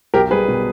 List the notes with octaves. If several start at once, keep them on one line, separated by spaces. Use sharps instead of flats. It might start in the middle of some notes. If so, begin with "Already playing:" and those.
B1 G4 A#4
G3 G#4 B4
B2